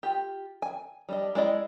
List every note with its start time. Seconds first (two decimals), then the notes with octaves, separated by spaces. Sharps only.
0.03 F4 G4
0.62 G#5
1.09 G3 D4 D#5
1.35 G#3 E4 D5 D#5 B5